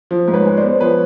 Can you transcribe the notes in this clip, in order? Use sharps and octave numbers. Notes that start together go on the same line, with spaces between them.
F3
G#2
B4 C#5
G#3
C5 D5
B3
F3 B4 C#5